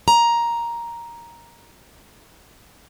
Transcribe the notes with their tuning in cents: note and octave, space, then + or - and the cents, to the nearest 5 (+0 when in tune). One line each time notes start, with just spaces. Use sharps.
A#5 +10